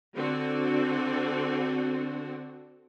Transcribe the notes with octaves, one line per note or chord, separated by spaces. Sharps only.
D3 C4 F#4